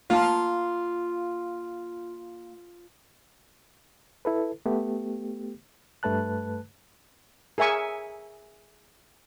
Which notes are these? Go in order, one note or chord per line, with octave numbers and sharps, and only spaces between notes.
A#3 F4 F5 A5
E4 A4 B4
A3 B3 G4
G2 A3 B4 A5 F#6
G#4 A#4 E5 G#5 C#6